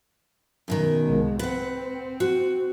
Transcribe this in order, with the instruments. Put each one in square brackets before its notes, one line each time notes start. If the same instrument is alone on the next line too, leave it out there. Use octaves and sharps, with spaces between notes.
[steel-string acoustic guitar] F#2 B2 D#3
[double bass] C2 G#3
[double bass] C4 [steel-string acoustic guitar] B4 F#5
[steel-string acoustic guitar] F#4